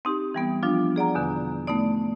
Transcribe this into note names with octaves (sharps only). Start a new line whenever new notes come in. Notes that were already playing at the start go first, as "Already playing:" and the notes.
C4 D#4 G4
E3 G3 B3
F3 D4 F4
G#4 D5 F#5 A#5
E2 B2 D3 B3
A3 B3 D#4 D5